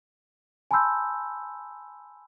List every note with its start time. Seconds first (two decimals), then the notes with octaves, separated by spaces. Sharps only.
0.71 G#5 A5 B5 C6 E6 G6